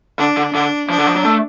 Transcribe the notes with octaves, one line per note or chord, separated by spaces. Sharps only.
D3 D4
D3
D3 D4
F3 D4
D3
F3
F#3
A3